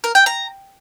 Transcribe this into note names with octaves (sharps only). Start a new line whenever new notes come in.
A#4
G5
A#5